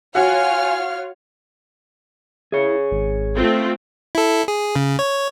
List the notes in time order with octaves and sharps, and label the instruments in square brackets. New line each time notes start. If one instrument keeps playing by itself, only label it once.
[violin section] F4 C#5 F6 [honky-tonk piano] F#4 F#5 [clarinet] F5 [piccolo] G#5
[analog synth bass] E4 [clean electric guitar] G#4 C#5
[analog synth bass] G#1
[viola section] A3 C4 F4
[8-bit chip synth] E4 A4
G#4
C#3
C#5